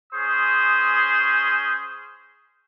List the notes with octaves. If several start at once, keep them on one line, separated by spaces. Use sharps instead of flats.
C#4 G#4 C5 C6 D#6